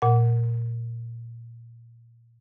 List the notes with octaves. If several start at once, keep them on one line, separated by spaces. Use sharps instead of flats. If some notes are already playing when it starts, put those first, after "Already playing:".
A#2 F#5